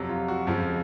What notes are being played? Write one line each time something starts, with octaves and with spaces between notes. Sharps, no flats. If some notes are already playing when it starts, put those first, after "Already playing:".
Already playing: F2 C3 F#3
F4
F#4
F2 C#3 F3 G#3